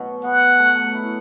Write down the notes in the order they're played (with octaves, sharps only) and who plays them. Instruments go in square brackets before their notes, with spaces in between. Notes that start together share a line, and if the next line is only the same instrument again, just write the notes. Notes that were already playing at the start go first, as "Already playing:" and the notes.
Already playing: [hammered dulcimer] B2 F#3 F#4
[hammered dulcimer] B3 [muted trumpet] F#5
[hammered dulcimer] A3
E4